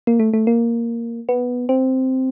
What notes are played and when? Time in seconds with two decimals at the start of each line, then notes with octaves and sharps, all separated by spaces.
0.07 A#3
0.20 A3
0.33 A3
0.47 A#3
1.29 B3
1.69 C4